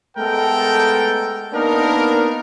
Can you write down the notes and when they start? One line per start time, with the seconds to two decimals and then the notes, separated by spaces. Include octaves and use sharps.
0.17 G#3 A3 B3 A4 A#4 G5
1.52 A#3 B3 D4 D#4 A#4